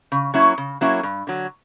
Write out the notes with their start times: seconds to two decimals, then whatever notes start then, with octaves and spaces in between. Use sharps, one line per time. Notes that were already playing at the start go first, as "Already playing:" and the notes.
0.12 C#3
0.34 F#3 A#3 C#4 E4
0.58 C#3
0.81 F#3 A#3 C#4 E4
1.03 G2
1.27 D3 F#3